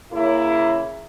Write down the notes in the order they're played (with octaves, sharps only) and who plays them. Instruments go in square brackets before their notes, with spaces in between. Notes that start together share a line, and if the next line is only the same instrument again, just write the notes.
[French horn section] C#3 A#3 E4